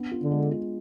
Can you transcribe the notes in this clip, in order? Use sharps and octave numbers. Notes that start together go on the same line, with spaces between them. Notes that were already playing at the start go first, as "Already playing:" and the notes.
Already playing: B3 D4
F4
D3
G#3
F4